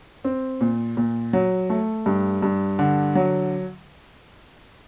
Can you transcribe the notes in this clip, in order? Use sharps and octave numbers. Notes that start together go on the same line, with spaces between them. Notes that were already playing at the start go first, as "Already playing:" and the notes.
C4
A#2
A#2
F#3
A3
G2
G2
D3
F#3